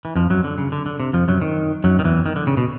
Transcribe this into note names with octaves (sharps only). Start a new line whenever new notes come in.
E3
F2 F3
F#2 F#3
D3
C#3
D3
D3
C3
F2 F3
F#2 F#3
D#3
F#2 F#3
D#3
E2 E3
D#3
D3
C#3
B2